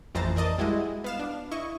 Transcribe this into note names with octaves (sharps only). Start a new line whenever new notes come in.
A1 F2 E3 C5 A#5 A6
A#4 D5 D#5 A5
G3 G#3 E4 F#4 D#5
B3 F5 E7
D4
E4 D#5 C#6